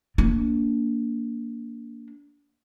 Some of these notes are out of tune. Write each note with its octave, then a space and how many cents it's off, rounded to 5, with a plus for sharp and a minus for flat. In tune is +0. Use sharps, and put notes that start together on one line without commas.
A#3 +0 D4 -25